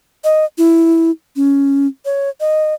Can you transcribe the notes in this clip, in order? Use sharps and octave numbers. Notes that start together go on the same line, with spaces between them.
D#5
E4
C#4
C#5
D#5